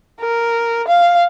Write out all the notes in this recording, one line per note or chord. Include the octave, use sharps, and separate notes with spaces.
A#4
F5